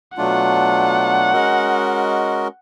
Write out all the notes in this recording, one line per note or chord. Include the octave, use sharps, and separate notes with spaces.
B2 F#3 A3 D4 F4 F#5
G#3 C#4 F#4 A#4 D#5